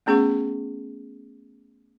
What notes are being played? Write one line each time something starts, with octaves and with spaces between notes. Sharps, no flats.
A3 B3 C#4 G#4 F#5 C#6